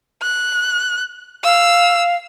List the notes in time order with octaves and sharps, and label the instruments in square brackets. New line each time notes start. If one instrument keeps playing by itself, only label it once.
[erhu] F#6
[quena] F5 [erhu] E6